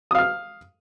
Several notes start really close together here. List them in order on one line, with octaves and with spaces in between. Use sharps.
D#6 F5 F6